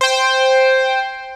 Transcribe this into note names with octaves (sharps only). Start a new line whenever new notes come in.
C5 G5